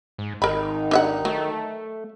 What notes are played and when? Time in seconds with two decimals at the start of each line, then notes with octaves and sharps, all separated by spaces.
0.18 G#2
0.42 G#1 D#3 D#4 A#4 B5
0.91 D4 E5 F#5
1.25 F#3 A3